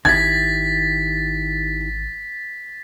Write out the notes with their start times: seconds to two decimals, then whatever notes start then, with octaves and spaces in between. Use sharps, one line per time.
0.05 G#1 D#3 E4 G4 G#6 A6 B6